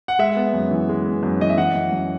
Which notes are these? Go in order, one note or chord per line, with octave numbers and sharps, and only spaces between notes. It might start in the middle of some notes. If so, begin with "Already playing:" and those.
F#5
G#3 E5
B3
F#2
E3
G#3
B3
F#2
E3 D#5
E5
E3 F#5
F#2
F#2